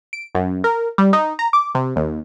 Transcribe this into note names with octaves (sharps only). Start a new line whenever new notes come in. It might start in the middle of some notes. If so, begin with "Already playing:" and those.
D7
F#2
A#4
G3
D#4
A#5
D6
C3
D#2